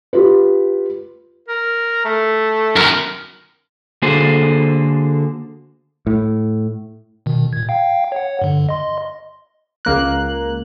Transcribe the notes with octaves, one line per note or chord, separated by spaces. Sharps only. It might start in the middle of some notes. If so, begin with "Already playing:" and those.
F4 G4 B4
A#4
A3
F#2 D#3 A#4
D3 A#3 F#4 G#4 A4 C5
A2
B2 D#3
A#2 G#6
F5 G5
C#5 F#5
G2 D3
D#5 C6
C#2 A#3 F#6